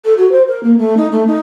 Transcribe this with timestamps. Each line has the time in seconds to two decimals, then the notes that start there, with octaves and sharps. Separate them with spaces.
0.05 A4
0.18 F#4
0.32 C5
0.48 A#4
0.63 A#3
0.78 A3
0.97 D#4
1.12 A3
1.27 D#4